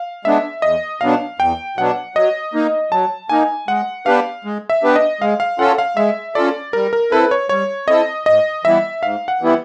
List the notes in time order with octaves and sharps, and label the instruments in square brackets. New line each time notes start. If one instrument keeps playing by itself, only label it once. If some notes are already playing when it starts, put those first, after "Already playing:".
Already playing: [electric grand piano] F5
[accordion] G#3 B3 D4 [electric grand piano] E5
[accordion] E2 [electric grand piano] D#5
[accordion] B2 F#3 B3 D4 [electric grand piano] F5
[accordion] E2 [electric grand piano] G5
[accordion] B2 F#3 B3 D4 [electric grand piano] F#5
[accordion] F#3 [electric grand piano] D#5
[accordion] A#3 D#4
[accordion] F#3 [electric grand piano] A5
[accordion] A#3 D#4 [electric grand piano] G#5
[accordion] G#3 [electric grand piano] F#5
[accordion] B3 D4 G4 B4 [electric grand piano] F5
[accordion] G#3
[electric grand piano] E5
[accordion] B3 D4 G4 B4
[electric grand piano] D#5
[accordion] G#3 [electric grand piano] F5
[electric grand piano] F5
[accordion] C#4 F4 A4 [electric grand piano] F#5
[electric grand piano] F5
[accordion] G#3 [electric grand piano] E5
[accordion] C#4 F4 A4 [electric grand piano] D5
[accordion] G3 [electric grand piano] A#4
[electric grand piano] A#4
[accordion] C4 E4 A4 [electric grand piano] B4
[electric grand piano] C#5
[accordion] G3 [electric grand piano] C#5
[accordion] C4 E4 A4 [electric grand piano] D#5
[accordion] G#2 [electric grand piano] D#5
[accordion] E3 G3 B3 E4 [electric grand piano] E5
[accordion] G#2 [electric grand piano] F5
[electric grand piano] F#5
[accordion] E3 G3 B3 E4